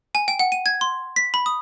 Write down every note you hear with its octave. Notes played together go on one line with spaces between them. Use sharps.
G#5
G5
F#5
D#7
G#6
C6
B6
B5
D#6